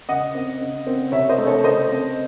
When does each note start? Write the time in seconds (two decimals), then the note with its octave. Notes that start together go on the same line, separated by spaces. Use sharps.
0.09 C#3 D#5 F#5
0.35 C4
0.61 C#3
0.87 C4
1.12 C3 C#5 E5
1.29 C5 D#5
1.38 A3
1.46 A4 C#5
1.64 C#3 C5 D#5
1.90 C4